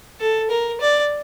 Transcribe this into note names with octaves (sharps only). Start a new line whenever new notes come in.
A4
A#4
D5